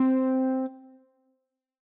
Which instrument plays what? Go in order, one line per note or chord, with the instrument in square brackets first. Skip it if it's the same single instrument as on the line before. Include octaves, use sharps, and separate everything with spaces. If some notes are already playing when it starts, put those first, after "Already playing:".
Already playing: [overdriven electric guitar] C4